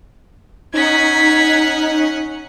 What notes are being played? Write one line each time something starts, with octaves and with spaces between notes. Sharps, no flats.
C#4 D#4 F#5 G#6 B6